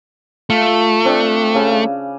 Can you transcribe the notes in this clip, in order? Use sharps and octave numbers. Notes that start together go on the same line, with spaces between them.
A3 F4
C4 D4
C#3